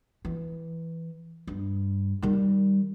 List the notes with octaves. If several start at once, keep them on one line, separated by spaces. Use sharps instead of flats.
E3
G2
D#3 G3